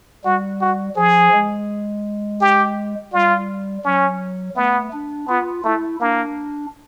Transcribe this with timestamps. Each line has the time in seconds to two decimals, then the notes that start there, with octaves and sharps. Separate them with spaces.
0.24 G3 F#4
0.61 F#4
0.96 F3 G#4
1.33 G#3
2.41 G4
3.13 G3 F4
3.85 F#3 C#4
4.56 A3 B3
4.93 D4
5.28 B3 F4
5.64 A3 E4
6.00 A#3 D4